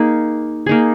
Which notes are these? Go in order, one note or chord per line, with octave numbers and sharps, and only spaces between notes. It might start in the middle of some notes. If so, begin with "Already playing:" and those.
Already playing: A#3 D#4 G#4
A#3 D#4 G#4